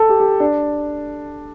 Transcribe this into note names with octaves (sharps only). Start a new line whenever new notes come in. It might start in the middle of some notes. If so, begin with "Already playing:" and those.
Already playing: A4
G4
G4
D4